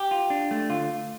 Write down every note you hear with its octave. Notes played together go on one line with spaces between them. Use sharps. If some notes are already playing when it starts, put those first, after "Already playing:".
Already playing: G4
F4
D4
A3
D3 F4